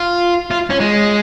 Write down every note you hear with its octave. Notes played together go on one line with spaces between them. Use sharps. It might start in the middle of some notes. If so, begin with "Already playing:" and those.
Already playing: F4
F4
C#4
G#3